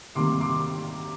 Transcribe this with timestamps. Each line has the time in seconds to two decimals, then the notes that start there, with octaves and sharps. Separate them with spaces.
0.15 C3 D#3 G3 A#3 C6 D6
0.41 C6 D6